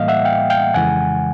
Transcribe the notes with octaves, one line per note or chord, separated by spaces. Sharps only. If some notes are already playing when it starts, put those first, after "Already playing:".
Already playing: A2 E3 G3 A#3 D#5 F5
E5 F#5
F5 G5
F5 G5
F2 C#3 E3 G#3 F#5 G#5